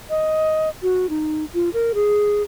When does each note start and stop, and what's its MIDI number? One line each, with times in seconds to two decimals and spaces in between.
0.10 0.69 75
0.82 1.06 66
1.09 1.44 63
1.54 1.69 65
1.73 1.92 70
1.94 2.42 68